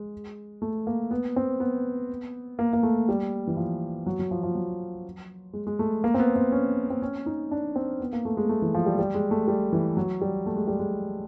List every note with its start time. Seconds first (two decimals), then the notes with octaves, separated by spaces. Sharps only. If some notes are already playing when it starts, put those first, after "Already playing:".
Already playing: G#3
0.62 A3
0.87 A#3
1.11 B3
1.36 C4
1.60 B3
2.59 A#3
2.73 A#3
2.83 A3
3.09 G3
3.47 E3
3.57 F3
4.06 F#3
4.19 F#3
4.31 F3
4.43 F3
4.55 F#3
5.53 G#3
5.67 G#3
5.79 A3
6.04 A#3
6.14 C4
6.19 B3
6.36 C4
6.52 C#4
6.90 C4
7.02 C#4
7.26 D#4
7.51 D4
7.76 C4
8.00 B3
8.13 A#3
8.25 A3
8.37 G#3
8.49 A3
8.62 E3
8.74 F3
8.86 G3
8.99 G3
9.15 G#3
9.31 A3
9.48 G3
9.72 E3
9.97 F#3
10.21 G3
10.46 A3
10.56 G#3
10.67 G3
10.79 G#3